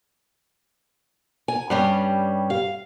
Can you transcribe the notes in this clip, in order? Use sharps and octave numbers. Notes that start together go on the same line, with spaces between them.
G#5
G2 G3 C#4
F5